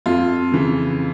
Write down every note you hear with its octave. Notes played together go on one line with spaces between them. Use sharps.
F2 F4
C#3 E3